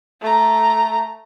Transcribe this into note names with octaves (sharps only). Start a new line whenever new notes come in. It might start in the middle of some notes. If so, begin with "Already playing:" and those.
A3 A#5